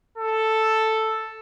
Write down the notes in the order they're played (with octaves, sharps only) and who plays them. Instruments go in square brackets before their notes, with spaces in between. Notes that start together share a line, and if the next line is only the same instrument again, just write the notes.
[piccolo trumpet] A4